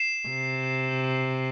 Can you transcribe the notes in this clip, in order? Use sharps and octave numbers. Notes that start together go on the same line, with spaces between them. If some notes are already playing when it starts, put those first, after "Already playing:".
Already playing: C7 E7
C3